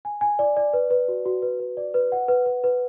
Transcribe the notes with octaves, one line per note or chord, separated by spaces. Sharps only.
G#5
G#5
D5
D5
B4
B4
F#4
F#4
B4
B4
D5
B4
F#5
B4
B4
B4